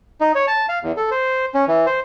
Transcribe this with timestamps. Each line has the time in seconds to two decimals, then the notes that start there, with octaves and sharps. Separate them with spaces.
0.21 D#4
0.35 C#5
0.48 A5
0.69 F5
0.83 E2
0.97 A4
1.11 C5
1.54 C#4
1.68 E3
1.86 C5